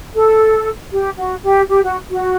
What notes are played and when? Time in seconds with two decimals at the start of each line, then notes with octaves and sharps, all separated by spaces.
0.15 A4
0.93 G4
1.17 F#4
1.43 G4
1.69 G4
1.83 F#4
2.10 F#4